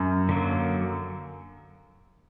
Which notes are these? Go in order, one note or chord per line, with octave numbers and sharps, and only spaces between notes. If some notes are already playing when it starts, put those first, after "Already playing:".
Already playing: F#2
D3 F#3 A#3